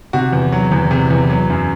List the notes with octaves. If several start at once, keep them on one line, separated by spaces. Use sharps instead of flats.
C3 F#4
E2
F#3
E2
C3
E2
F#3
F#2